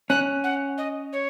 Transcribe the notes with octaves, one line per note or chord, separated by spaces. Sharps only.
C#4 F#6
F#5
D#5
C#5